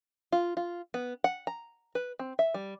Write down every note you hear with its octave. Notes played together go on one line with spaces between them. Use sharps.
F4
F4
B3
F#5
A#5
B4
C4
E5
G3